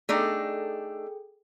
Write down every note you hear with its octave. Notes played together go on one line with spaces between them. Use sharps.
A3 D4 D#4 G#4 A4 G5